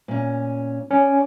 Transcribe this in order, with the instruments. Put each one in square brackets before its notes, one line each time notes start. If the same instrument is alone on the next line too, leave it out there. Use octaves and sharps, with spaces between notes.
[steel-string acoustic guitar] A#2 C#4
[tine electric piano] C#4 [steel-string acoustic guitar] D5